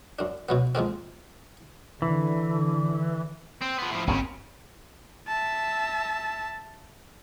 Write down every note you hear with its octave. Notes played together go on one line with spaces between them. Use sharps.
F#2 D4
B2 F#3 B3
F3 G#3 A#3 C4
D3 E3
C4
F3 B3
A2 F3
G#1 D#2 C#3 C4
E5 A5